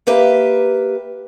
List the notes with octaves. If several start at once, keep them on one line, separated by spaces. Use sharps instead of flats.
A#3 G4 B4 E5